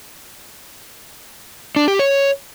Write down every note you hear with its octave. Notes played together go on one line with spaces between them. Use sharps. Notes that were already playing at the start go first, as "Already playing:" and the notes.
D4
G4
C#5